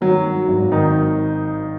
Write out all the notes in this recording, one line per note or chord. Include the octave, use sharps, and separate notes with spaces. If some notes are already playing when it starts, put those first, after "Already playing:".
D#3 F#3 F#4
F#3
G#1
D#3 D#4